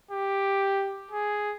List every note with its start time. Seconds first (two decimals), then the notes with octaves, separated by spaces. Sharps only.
0.11 G4
1.11 G#4